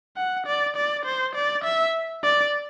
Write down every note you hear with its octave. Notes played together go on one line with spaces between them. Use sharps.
F#5
D5
D5
C5
D5
E5
D5